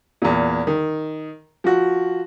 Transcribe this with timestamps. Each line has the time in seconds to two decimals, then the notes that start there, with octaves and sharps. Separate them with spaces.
0.22 E2 A#2
0.67 D#3
1.64 F3 F#4